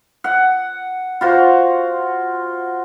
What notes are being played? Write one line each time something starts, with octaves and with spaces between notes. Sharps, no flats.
F#5
F4 F#4 C5